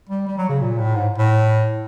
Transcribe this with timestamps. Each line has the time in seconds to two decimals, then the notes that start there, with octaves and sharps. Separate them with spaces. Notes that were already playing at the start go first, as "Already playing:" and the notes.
0.09 G3
0.27 G3
0.38 F#3
0.49 C#3
0.61 A#2
0.79 A2
0.95 G#2
1.18 A2